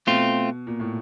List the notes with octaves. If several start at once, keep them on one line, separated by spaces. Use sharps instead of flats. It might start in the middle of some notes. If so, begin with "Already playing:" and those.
B2 A3 C4 F4
A#2
A2